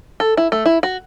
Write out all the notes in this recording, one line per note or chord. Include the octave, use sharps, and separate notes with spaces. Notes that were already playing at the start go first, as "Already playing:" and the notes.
A4
E4
A3
E4
F#4